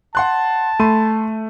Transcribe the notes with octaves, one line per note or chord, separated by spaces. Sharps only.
F#5 A5 C6 F#6
A3 B5 C6 D#7